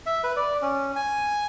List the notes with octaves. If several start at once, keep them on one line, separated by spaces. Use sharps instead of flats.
E5
B4
D5
C#4
G#5